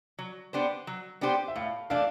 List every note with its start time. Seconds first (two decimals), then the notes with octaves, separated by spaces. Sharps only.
0.19 F#3
0.53 B3 D4 G4 C5
0.87 F#3
1.21 B3 D4 G4 C5
1.48 E5
1.56 A2 F5
1.90 E3 A3 D4 F5